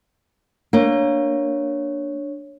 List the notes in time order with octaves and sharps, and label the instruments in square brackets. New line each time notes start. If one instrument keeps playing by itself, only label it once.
[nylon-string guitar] A#3 [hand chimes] D4 C#5